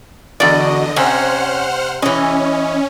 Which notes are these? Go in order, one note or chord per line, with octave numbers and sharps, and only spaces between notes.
E2 D3 F#4 D5 D#5
C3 C#4 C5 F#5 F6
E3 C#4 D#5